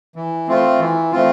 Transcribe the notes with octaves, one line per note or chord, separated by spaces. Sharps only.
E3
A3 C4 F4
E3
A3 C4 F4